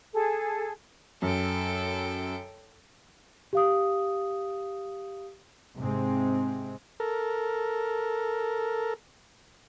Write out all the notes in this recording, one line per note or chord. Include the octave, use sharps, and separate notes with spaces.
G#4 A4
F#2 A4 G5
G4 F5 D#6
G#2 C3 G#3 C4
A4 A#4